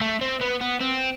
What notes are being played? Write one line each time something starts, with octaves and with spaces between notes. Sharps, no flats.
A3
C4
B3
B3
C4